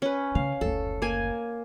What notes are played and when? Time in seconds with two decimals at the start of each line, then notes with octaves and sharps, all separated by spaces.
0.02 C#4 B4
0.35 C#3 F5
0.61 F#1 D2 A4
1.02 A#3 G#5